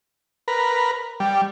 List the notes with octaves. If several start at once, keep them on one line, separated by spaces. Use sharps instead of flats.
A#4 B4
G3